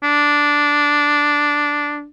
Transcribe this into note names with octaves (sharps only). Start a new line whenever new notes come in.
D4